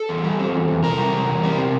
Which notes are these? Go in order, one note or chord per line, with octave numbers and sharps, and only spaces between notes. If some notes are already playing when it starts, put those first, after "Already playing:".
Already playing: A4
E2
G3
C4
E2
E2
C3 A#4
G3
C3
E2
G3
C3